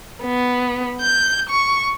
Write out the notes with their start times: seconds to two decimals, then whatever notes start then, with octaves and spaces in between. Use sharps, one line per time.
0.23 B3
1.01 G6
1.49 C#6